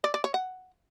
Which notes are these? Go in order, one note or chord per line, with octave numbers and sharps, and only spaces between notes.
D5
D5
C#5
F#5